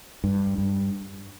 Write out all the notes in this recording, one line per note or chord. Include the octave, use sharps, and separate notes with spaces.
G2
G2